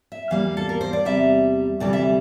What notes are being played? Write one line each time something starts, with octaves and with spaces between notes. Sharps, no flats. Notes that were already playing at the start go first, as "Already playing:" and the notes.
E5
E2 E3 G3 A#3 F5
A4
A#4
C5
D5
E2 C3 G3 E5
D2 C3 E3 G3 D5
E5